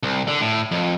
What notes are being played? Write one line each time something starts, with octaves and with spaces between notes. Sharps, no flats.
C2
D3
A2
F2